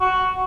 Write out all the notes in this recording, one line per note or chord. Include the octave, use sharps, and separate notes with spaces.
F#4